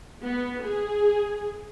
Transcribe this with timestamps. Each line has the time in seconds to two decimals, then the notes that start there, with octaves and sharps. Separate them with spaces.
0.23 B3
0.64 G#4